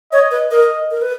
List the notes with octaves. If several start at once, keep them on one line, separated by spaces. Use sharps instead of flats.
C#5 D#5
B4
A#4 D#5
A#4
B4